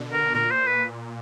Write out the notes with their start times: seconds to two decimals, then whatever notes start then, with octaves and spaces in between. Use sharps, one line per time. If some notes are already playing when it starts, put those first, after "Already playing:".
Already playing: B2 D3
0.13 A#4
0.34 A#2 A#4
0.51 C5
0.67 B4